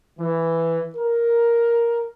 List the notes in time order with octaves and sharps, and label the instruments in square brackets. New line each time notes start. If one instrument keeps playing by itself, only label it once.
[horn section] E3
A#4